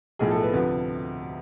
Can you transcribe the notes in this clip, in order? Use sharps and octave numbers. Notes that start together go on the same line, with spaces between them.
B1 A2 F3 G#4
A4
B4
D2 C3 F3 B4